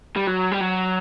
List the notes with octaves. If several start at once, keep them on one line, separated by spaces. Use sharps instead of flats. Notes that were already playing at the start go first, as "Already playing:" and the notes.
G3
F#3
G3
F#3